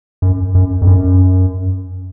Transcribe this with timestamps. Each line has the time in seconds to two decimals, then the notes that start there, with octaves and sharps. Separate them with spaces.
0.22 F#2
0.55 F#2
0.82 F2
0.87 F#2